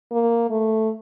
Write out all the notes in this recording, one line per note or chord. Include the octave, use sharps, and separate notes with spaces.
A#3
A3